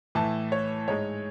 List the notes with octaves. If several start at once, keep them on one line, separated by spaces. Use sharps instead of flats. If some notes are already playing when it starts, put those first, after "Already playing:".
A2 E3 A3 A5
C#5
G#2 G#3 C#5